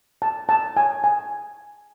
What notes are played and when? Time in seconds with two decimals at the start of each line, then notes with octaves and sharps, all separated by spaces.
0.22 A5
0.49 A5
0.77 G#5
1.04 G#5